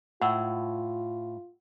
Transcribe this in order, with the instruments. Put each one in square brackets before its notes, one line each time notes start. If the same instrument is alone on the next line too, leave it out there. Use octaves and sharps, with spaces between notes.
[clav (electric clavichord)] A2 [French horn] F4 [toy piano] F#5 E6